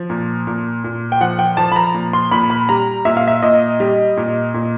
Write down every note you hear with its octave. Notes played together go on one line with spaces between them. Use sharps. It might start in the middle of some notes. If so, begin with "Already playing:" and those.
Already playing: F3
A#2
A#2
A#2
G5
F3 F#5
G5
F3 A5
B5
A#5
A#2
C6
A#2 B5
B5
G3 A#5
A#2 E5
F5
E5
A#2 D#5
G3
A#2
A#2